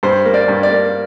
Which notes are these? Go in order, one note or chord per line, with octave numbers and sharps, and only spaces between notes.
G2 C5
A#3
D5
G2
D5
A#3